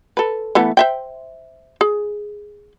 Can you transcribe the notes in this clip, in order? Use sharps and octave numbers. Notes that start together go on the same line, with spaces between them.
A4 B4
E3 A3 B3
C5 E5 G5
G#4